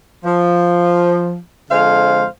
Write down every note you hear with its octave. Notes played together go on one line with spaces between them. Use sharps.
F3
F2 D3 G#3 C5 F5